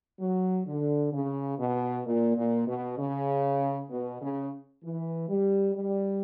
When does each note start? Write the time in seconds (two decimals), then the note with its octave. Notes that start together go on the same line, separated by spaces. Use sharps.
0.20 F#3
0.67 D3
1.13 C#3
1.59 B2
2.06 A#2
2.37 A#2
2.67 B2
2.99 C#3
3.90 B2
4.22 C#3
4.84 E3
5.29 G3
5.75 G3